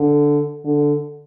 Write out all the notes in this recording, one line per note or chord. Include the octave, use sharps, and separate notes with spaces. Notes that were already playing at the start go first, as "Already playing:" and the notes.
Already playing: D3
D3